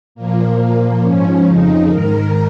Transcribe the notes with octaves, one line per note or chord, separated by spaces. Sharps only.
A#2 F3 A#3
A#2 F3 A#3
G#2 F3 C#4
F2 C#3 F3 D#4
G#2 D#3 A#4